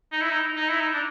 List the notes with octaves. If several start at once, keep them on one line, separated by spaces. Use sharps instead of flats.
D#4
E4
D#4
D#4
E4
D#4
D4